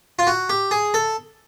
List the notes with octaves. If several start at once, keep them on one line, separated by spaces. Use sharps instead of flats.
F4
F#4
G4
G#4
A4